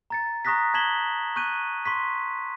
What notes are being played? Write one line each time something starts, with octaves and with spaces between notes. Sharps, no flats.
A#5 A6 C#7
A#5 C#6 D#6 F#6 A#6 B6
A5 G#6 B6 E7 F#7 G7
C#6 F#6 G6 D#7
C6 C#6 B6